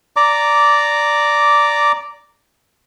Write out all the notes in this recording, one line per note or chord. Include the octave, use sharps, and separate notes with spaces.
D5 A#5 D6